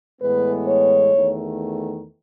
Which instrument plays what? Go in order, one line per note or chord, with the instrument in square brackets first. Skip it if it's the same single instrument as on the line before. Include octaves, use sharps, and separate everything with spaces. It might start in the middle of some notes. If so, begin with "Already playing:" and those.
[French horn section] A2 E3 G#3 B3 B4
C#5
E2 D#3 A3